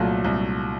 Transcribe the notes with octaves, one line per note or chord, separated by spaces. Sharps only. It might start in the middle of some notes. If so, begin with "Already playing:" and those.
Already playing: C2 A#2 F#3 A3
C2